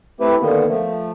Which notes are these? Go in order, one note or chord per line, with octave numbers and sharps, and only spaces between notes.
A3 C4 E4 G4 B4
D3 D#3 A#3 B3
F3 A3